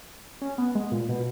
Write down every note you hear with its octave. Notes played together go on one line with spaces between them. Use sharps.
C#4
B3
G#3
A#2
B2